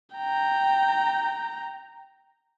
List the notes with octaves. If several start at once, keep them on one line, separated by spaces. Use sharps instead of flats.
G5 A#5